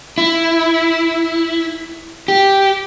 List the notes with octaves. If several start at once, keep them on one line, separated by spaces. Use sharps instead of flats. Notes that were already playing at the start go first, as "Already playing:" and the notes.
E4
G4